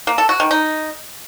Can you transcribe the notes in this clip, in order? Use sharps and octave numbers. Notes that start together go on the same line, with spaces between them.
A#3
A4
F#4
D#3
D#4